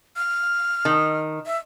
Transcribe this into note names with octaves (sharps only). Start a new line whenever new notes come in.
F6
D#3
E5